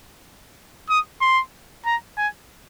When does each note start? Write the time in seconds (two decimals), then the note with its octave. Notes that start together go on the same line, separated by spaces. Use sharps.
0.90 D#6
1.21 C6
1.86 A#5
2.18 G#5